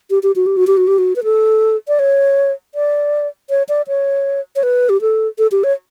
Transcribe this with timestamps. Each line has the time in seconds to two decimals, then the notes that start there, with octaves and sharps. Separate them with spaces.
0.10 G4
0.23 G4
0.36 F#4
0.46 G4
0.57 F#4
0.67 G4
0.77 F#4
0.87 G4
0.98 F#4
1.16 B4
1.24 A4
1.88 D5
1.99 C#5
2.75 D5
3.50 C#5
3.69 D5
3.88 C#5
4.56 C#5
4.63 B4
4.89 G4
5.01 A4
5.38 A4
5.52 G4
5.64 C#5